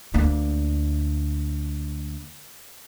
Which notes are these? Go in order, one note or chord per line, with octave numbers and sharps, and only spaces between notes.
D2 A#3